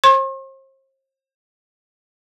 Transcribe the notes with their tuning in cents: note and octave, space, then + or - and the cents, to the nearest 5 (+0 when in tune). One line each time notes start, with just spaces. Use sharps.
C5 +40 C6 +45